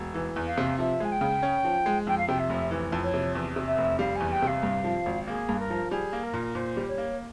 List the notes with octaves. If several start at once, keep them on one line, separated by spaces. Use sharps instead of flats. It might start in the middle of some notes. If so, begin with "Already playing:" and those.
Already playing: E1
E3
E2
F5
C3
F3 E5
G#3 G#5
G5
C#3
C#4
F3
G#3
F2 G5
F5
C3 G5
E5
F1
E3
F2
C#5
C3
E2
C3
E5
F1
G3 F5
E2 G#5
G5
C3 F5
G2
F3
G#1
A#3 G#4
G2
A#4
F3
G3 G#4
A#3
A#4
A#2
A#2 C5
G3
C#5
A#3